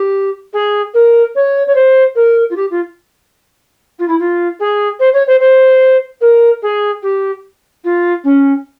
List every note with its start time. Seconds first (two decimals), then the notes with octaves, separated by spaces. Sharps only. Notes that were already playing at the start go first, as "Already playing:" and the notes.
Already playing: G4
0.53 G#4
0.94 A#4
1.35 C#5
1.67 C#5
1.75 C5
2.15 A#4
2.50 F4
2.56 G4
2.70 F4
3.99 F4
4.08 E4
4.19 F4
4.59 G#4
4.99 C5
5.13 C#5
5.27 C5
5.40 C5
6.21 A#4
6.62 G#4
7.02 G4
7.84 F4
8.24 C#4